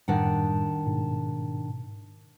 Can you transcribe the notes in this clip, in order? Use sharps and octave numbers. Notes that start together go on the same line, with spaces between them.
F#2 A2 D#3 G3 D4 F#5
G#2 B2